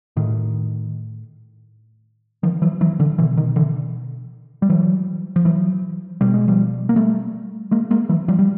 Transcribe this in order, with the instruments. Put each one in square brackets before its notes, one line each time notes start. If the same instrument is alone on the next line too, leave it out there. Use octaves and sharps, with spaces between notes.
[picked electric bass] A2 D#3
D#3 F3
E3 F#3
E3 F#3
D3 E3
B2 D3 E3
D#3
D3 E3
G3
E3 F#3
F3
E3 F#3
B2 G3
G#3
F3 G3
A#3
G3 A3
G#3 A#3
G#3 A#3
E3 F#3
F3 G3
G3